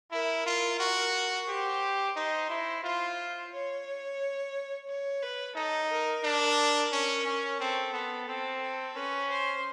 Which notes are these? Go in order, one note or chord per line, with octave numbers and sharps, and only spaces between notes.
E4 A#4
F4
F#4
G4 C5
D#4 C5
E4
F4 C5
C#5
C#5
B4
D#4 A4
A#4
D4
C#4
C#4
C4 A4
B3 A4
C4 A4
A4
C#4 B4
C5